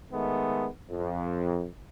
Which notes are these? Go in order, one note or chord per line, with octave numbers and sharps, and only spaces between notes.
D#3 G#3 A3 B3
F2